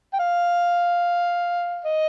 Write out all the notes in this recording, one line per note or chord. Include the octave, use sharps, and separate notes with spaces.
G5
F5
D#5